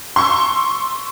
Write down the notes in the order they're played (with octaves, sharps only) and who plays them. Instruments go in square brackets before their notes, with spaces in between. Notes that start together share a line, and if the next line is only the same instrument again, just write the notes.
[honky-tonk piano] C6 C#6 E6